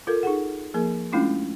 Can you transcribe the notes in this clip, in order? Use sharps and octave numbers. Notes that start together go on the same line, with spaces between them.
F4 A4 A#4
D#4 G#4 F#5
F3 A#3 G#4 A#4
G#3 A3 C#4 D4 E4 F4